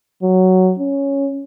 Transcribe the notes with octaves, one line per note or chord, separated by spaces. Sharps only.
F#3
C#4